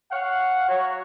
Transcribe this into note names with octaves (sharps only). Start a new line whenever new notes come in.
C#5 F5 F#5
F#3 F#4 C#5